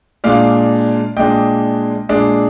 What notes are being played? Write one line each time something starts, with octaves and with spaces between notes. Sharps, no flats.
A#2 G#3 D4 D5 F5
A#2 G#3 D4 D#5 G5
A#2 G#3 D4